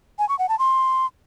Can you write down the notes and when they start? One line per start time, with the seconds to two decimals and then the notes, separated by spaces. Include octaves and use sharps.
0.19 G#5
0.29 C#6
0.39 F#5
0.49 A5
0.59 C6